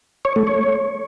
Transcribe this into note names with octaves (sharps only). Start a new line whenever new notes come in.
C#5
A3
C#5